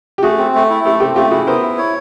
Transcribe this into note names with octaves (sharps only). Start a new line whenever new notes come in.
G4
A3 F#4 G#4
C4
A3
E4
A3 G4 A4
C4 G4 A4
A3 F4 G4
E4 F#4 G#4
B3 A#4 C5
E4
C#5